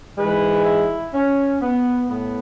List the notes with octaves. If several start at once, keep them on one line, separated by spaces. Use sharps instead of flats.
G#2 E3 G#3 B4
E4
C#4
B3
A2 B3